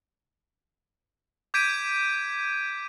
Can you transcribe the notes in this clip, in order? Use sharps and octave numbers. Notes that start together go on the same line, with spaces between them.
D6 G6 G#6 B6 D7 D#7